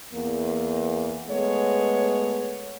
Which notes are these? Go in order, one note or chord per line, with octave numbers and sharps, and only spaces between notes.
E2 A#3
G#3 A3 B3 C#5